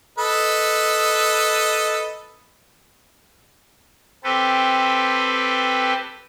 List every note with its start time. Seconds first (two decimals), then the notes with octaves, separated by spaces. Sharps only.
0.18 A4 B4 D#5
4.24 C4 G4 A4 B4